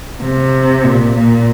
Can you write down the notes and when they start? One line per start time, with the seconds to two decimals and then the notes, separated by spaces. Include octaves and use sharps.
0.23 C3
0.84 A#2
1.15 A#2